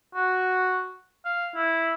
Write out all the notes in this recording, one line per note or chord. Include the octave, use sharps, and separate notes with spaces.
F#4
F5
E4